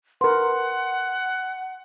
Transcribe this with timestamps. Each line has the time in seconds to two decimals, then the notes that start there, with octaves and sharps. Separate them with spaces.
0.21 A#4 B4 F#5 C6